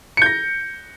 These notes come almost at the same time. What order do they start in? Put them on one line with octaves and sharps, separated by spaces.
C#7 G6 A#6